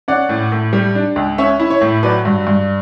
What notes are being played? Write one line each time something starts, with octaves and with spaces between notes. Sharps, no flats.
C#4 D5 F#5
A2
A2
G3
D4
C#2
C#4 C#5 E5
E4
C#5
A2
F#3 B4 D5
G2
G2